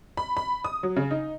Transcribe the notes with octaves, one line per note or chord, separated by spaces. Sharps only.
B5
B5
D#6
F#3
C#3
D#4